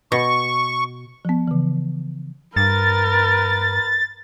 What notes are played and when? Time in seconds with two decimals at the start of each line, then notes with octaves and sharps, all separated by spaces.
0.12 B2 C#6
1.25 F3 B3
1.48 C#3 E3
2.56 G2 A#4 B4 A6